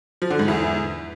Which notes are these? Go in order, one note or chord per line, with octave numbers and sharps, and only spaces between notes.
F3
D3
G#2
E2